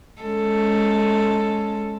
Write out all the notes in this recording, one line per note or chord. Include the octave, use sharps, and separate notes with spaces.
G#3 C#4 A4